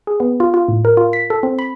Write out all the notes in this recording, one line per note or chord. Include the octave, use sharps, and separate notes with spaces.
G#4
B3
F4
F4
A2
A#4
F4
B6
A4
C4
B5